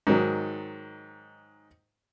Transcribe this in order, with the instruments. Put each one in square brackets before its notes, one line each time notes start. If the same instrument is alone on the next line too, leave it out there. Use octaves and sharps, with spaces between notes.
[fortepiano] G#2 D#3 F#3